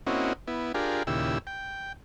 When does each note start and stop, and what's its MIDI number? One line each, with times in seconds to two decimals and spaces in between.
0.07 0.33 58
0.07 0.33 60
0.07 0.33 61
0.07 0.33 64
0.07 0.33 66
0.07 0.33 75
0.47 0.72 59
0.47 0.72 64
0.74 1.03 62
0.74 1.03 65
0.74 1.03 67
0.74 1.03 68
0.74 1.03 70
1.07 1.38 39
1.07 1.38 46
1.07 1.38 49
1.07 1.38 64
1.07 1.38 67
1.07 1.38 88
1.47 1.93 79